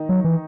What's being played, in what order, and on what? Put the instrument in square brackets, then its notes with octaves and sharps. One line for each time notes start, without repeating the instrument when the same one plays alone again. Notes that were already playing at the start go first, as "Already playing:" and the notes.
Already playing: [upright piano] D#3 D#4
[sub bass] F#3
E3